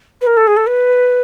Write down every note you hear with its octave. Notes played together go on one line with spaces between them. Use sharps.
B4
A#4
A4
G#4
A4
B4